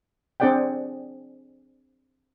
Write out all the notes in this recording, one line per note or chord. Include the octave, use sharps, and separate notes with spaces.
C4 D4 G#4 D5 F#5 G5